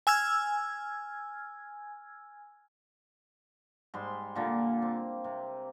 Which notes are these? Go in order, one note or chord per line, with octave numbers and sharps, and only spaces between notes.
G#5 E6 F6 G#6
G#2 G3 C6
A#2 D3 A#3
C4
C3